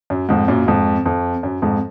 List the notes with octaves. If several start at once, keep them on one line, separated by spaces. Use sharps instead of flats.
F#2
F2 G#2
F#2 A#2
F2 G#2
F2
F#2
F2 G#2